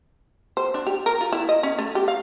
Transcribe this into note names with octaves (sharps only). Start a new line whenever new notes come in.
C5
D4
G4
A#4
F4
E4
D#5
C#4
A3
G4
F5